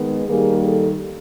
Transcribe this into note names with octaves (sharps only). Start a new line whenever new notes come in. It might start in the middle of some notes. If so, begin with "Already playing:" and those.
Already playing: D#3 G#3 B3
D#3 G3 A#3 G#4
A4